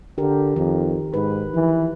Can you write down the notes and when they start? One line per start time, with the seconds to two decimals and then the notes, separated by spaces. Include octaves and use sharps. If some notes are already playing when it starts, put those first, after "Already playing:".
0.18 D3 G4 A#4
0.56 F2 D#3
1.14 G#2 B4
1.54 E3 F3